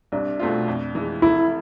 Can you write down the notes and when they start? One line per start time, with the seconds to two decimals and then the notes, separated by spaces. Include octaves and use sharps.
0.12 C2 D4
0.40 B2 A3 C4 F4
0.68 F2
0.95 E3 G#3
1.22 F1 E4